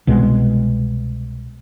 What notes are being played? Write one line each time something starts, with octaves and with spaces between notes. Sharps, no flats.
C2 B2 G#3